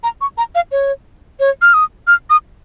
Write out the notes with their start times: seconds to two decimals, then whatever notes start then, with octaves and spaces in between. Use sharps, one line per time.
0.03 A#5
0.21 C#6
0.38 A#5
0.55 F5
0.72 C#5
1.40 C#5
1.62 F6
1.74 D#6
2.07 F6
2.30 D#6